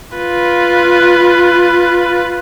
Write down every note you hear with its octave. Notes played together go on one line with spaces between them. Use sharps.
F4 B4